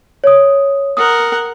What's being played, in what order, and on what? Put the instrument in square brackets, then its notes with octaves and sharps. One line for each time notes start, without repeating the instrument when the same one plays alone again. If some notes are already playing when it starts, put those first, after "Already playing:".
[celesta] C#5 D#6
[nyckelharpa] A#4 F#5 [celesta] D#6